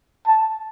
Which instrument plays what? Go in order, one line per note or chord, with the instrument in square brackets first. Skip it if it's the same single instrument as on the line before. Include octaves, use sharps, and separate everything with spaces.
[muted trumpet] A5